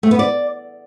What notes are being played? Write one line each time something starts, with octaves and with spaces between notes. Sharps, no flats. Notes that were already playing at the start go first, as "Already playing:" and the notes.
A3
B3
D5